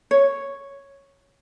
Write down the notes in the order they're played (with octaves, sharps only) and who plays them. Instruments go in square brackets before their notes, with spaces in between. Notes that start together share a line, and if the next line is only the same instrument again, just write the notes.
[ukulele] C#5